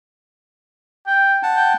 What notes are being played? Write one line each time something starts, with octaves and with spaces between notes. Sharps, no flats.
G5
F#5 A5
G5